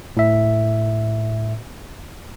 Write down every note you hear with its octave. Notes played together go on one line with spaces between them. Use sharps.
A2 E5